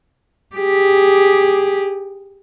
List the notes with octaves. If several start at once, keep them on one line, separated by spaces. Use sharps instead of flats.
G4 G#4